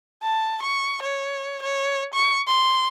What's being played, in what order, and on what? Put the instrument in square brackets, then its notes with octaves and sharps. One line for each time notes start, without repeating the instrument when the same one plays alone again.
[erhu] A5
C#6
C#5
C#5
C#6
C6